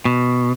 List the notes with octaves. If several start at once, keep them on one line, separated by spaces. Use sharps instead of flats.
B2